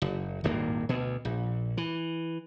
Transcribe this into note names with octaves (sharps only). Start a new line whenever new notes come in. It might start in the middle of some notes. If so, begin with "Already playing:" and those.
F#1
D#1 G#1 G2 A#3
D2 B2
A#1
E3